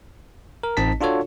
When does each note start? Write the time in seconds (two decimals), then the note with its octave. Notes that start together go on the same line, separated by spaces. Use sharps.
0.63 A#4
0.77 A1 C4 D#4 D#5 A5 B6
1.01 D4 F4 F#4 A4 C#5